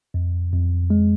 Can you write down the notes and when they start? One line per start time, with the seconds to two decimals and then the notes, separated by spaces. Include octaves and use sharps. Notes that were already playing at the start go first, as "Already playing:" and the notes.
0.14 F2
0.53 F2
0.90 G#3